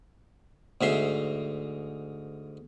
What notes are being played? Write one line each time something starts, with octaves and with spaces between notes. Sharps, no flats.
D2 G#2 E5 C6